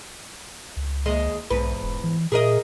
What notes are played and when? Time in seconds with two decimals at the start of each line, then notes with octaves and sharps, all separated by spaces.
0.77 C#2
1.06 D#2 G#3 D#5
1.50 B1 E2 G#2 B4
1.83 E1
2.04 E3
2.32 A#2 G#4 A#4 D#5